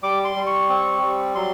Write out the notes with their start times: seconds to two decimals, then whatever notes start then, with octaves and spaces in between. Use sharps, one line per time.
0.03 G3 D6
0.25 C6
0.36 G3
0.47 C#6
0.69 C4
1.02 G3
1.35 F#3 C6